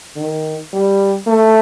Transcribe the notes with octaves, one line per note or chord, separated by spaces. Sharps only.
D#3
G3
A3